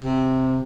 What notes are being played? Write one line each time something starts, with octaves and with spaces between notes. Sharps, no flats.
C3